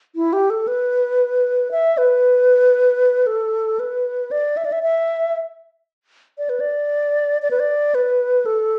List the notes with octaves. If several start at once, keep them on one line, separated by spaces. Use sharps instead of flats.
E4
G4
A4
B4
E5
B4
A4
B4
D5
E5
D5
E5
E5
D5
B4
D5
D5
B4
D5
B4
A4